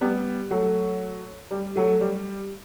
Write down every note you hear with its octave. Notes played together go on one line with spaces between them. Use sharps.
G3 B3
F#3 A3
G3
F#3 A3
G3